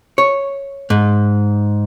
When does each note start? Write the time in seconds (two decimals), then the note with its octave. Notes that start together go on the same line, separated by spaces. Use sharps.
0.18 C#5
0.90 G#2